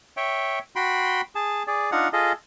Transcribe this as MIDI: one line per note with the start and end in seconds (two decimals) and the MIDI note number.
0.17 0.59 73
0.17 0.59 76
0.17 0.59 79
0.76 1.21 66
0.76 1.21 79
0.76 1.21 83
0.76 1.21 84
1.35 1.63 68
1.35 1.63 81
1.67 1.90 68
1.67 1.90 74
1.92 2.08 62
1.92 2.08 63
1.92 2.08 65
1.92 2.08 78
2.13 2.32 65
2.13 2.32 68
2.13 2.32 69
2.13 2.32 75